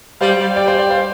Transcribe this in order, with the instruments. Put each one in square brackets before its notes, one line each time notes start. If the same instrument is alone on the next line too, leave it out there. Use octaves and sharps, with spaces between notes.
[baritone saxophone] G3 [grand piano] C5 F5
[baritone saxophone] G3
[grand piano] D5 G5
C5 F5
D5 G5
C5 F5